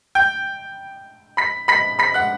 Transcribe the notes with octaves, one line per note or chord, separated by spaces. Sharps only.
G5 G6
B5 B6
B5 B6
B5 B6
F#5 F#6